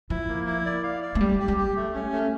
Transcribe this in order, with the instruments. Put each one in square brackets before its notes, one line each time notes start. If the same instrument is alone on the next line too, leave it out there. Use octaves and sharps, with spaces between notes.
[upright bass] F3 [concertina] E4
[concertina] A#3
E4
D5
F5
D5
[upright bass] A3
[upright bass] G3 [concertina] G4
[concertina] G4
[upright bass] G3
[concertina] G4
A3
C#4
A3